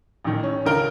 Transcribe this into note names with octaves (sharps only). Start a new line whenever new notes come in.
A1 A2 D#3
C#4
C#2 D3 D#3 A#4 D7 G7